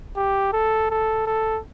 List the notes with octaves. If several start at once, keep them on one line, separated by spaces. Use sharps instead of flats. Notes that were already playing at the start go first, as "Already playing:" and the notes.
G4
A4
A4
A4